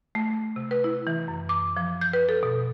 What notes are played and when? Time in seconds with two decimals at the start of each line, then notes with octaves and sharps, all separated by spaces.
0.15 A3
0.56 C3
0.71 B4
0.84 E4
1.07 E3
1.28 F#2
1.49 D6
1.77 F3
2.01 G6
2.13 B4
2.29 A4
2.43 B2